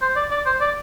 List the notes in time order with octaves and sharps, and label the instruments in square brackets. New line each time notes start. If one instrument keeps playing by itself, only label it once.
[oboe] C5
D5
D5
C5
D5